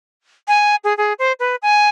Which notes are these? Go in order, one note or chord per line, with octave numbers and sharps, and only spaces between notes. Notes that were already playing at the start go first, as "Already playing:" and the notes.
G#5
G#4
G#4
C5
B4
G#5